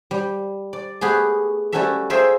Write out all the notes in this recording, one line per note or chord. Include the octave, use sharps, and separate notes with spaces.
G3
D5
A3 B3 G4 G#4
G3 A3 C#4 F#4 A4 E5
F4 G#4 A#4 C5 E5 G5